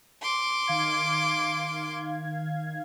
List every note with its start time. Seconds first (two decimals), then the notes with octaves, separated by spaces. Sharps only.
0.22 C6 D6
0.67 D#3 F5 G#6